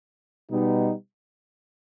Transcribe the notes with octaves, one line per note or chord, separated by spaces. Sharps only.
B2 G3 B3 D#4